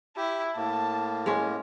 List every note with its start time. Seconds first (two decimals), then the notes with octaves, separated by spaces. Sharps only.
0.17 E4 G4
0.56 A2 A#3 A5
1.26 G#3 C#4